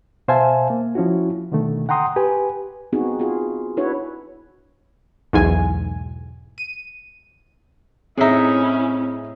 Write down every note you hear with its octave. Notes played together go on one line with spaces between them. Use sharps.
B2 C5 E5 F5 G#5 A5
A#3
F3 C#4 E4 F#4
B2 D3 D#3 A3
F#5 G5 A#5 C6 D#6
G4 B4 G#5
B3 C4 D#4 F#4 G#4
F4 G#4
D4 E4 F#4 B4 C#5
B1 E2 G#2 G#5
D#7
A2 C4 C#4 D#4 E4 G#4 E5